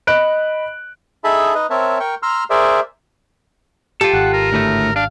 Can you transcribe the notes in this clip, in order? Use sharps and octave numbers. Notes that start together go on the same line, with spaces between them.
D#5 B5 F#6 D7
D#4 G#4 A4 E5 A5 B5
D#4 B4 D#5
C4 A#4 C#5 E5 A5
A#4 G5 C#6
A#5 C6 E6 F6
G#4 A#4 C5 D5 E5
F4 G4 A4
G#1 F#5
A#4
D2 A2 A3
D4 F5